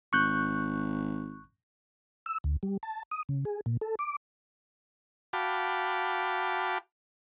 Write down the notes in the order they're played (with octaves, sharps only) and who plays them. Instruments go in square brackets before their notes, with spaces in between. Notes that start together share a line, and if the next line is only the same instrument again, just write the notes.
[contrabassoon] G#1 [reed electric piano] C#6 F#6 G6
[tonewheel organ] E6
D2
G3
A5
D#6
C#3
G#4
A#2
A4
D6
[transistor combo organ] F#4 F5 G5 A5 B5 D6